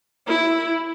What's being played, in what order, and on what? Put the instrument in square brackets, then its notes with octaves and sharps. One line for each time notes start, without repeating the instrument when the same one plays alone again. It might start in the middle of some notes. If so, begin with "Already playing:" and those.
[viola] E4